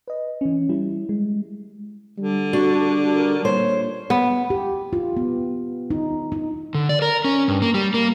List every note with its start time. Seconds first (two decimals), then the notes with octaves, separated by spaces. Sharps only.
0.08 B4 D#5
0.41 E3 C#4
0.69 G3 E4
1.09 G#3
2.18 D3 G3
2.53 D4 F#4
3.14 A#4
3.45 A#2 C5 C#5
4.10 B3
4.50 G4
4.93 F4
5.17 B3
5.90 D#4
6.32 D#4
6.75 D3
6.89 D5
7.02 A#4
7.25 C#4
7.48 G2
7.62 A#3
7.74 G3
7.94 A#3